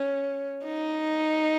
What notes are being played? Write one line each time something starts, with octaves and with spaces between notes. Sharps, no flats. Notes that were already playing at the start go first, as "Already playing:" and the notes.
Already playing: C#4
D#4